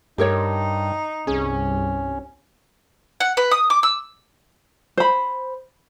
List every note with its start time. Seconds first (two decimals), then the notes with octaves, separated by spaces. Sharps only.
0.18 G2 D#4 G4 A#4 C#5
1.27 C2 G2 C#4 G#4
3.20 F#5
3.37 B4
3.51 D#6
3.70 D6
3.83 E6
4.97 C5 B5